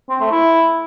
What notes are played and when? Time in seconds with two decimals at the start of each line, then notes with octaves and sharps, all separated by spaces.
0.09 C4
0.21 A3
0.32 E4